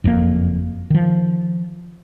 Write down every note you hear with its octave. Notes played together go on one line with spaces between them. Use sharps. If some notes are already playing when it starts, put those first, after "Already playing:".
F#1 F2 C#3 A#3
D#3 F3